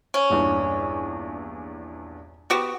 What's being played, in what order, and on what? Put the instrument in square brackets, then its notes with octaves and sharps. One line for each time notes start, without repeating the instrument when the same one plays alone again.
[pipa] C#4
[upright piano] A#1 E2 G2
[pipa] B3 F#4 G4